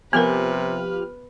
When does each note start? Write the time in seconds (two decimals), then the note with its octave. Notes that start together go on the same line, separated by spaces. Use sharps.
0.13 C3 F3 B3 G4 A#4 B4 F6